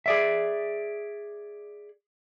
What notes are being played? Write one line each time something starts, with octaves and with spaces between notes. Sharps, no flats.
G#4 D5 E5